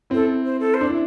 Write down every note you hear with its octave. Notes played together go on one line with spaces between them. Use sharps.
C4 E4 A4
C5
A4
C5
D4
E4